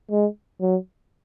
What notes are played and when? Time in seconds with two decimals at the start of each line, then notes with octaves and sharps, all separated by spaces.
0.11 G#3
0.61 F#3